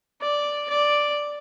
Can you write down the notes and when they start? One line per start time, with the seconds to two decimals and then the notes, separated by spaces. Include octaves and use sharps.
0.21 D5
0.69 D5